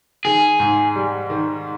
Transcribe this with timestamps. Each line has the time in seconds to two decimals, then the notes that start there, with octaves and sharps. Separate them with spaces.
0.25 D#3 G#4
0.60 G#2
0.96 G3
1.30 D#3